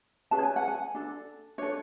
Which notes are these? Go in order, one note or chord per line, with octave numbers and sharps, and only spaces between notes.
C#4 G#4 B4 A5
G#5
F#5
G#5
D4 A4
D4 A4 C#5